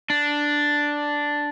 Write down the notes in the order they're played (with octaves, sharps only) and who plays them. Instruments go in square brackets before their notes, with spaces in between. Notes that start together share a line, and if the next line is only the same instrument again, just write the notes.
[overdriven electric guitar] D4